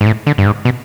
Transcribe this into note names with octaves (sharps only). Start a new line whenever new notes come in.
G#2
A2
D3
G2
G#2
B2